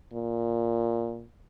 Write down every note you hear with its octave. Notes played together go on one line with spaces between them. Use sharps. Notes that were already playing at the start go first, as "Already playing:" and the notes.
A#2